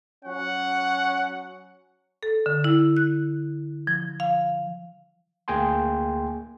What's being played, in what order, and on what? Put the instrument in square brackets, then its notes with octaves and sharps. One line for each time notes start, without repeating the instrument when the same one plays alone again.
[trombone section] F#3 C#4 [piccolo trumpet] F#5
[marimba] A4
D3
E4
F#6
F3
F5
[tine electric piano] D2 A#3 G#4 G5 G#5 C6